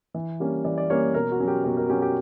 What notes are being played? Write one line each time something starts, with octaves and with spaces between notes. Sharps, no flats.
E3
G3 A#3 C#4
E3 D5
D5
G3 A#3 C#4 C#5
B2 A#4
F#4
F#3 C#4
G4
B2 A#4
A#4
F#3 C#4 G4
G4